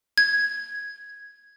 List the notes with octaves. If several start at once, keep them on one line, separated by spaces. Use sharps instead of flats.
G#6